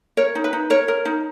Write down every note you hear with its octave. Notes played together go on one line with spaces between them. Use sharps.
A#4 C#5
D#4
B4
D#4
A#4 C#5
A#4
D#4